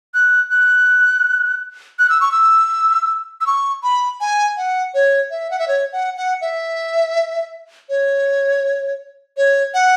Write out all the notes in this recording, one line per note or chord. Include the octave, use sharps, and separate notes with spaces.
F#6
F#6
F#6
E6
C#6
E6
E6
C#6
B5
G#5
F#5
C#5
E5
F#5
E5
C#5
F#5
F#5
E5
C#5
C#5
F#5